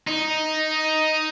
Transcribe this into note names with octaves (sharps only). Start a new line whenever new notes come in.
D#4